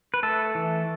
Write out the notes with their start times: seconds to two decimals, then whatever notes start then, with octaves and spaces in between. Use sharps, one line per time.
0.14 B4
0.23 A3 A4
0.55 E3